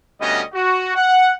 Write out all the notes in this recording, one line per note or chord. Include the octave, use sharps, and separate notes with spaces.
D2 G3 B3 C#4 D#5
F#4
F#5